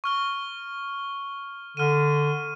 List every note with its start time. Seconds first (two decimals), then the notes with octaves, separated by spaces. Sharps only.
0.04 C#6 F6 G7
1.77 D3 F6 D#7